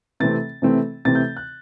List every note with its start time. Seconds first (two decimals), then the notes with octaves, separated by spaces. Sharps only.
0.20 C3 E3 A3 C4 A6
0.62 C3 E3 A3 C4
1.05 C3 E3 A3 C4 A6
1.15 G6
1.37 F#6